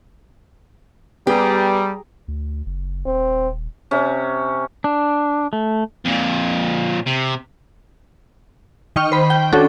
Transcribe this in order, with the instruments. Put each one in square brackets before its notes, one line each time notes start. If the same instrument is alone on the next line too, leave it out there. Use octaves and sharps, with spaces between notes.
[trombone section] G3 [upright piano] B3 [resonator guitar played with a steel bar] G4 [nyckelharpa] G#4 A#5
[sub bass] D2
F#1
[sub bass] D#1 [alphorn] C4
[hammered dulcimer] C3 C#4
[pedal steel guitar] D4
A3
[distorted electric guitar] F2 A#2
C3
[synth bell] D#3 D#5 G5 C#6 F6
C5 B5
G5
C#4 D4 F#4 A4